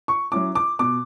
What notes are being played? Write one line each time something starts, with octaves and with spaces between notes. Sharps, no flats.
C#6
F#3 C#4 E4 D6
D6
B2 D6